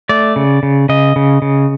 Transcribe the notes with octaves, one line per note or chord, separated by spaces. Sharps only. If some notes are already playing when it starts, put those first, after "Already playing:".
A3 D5
C#3
C#3
C#3 D#5
C#3
C#3